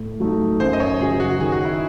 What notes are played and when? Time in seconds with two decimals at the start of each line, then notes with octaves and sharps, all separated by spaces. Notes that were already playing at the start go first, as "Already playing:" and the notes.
Already playing: A2
0.20 F#3 A3 D#4
0.60 F#2 C5
0.73 D#5
0.80 C#5
0.99 C#3 F#3 C#4 G#4
1.20 F#4
1.39 D#3 G#4
1.52 F#4
1.65 E4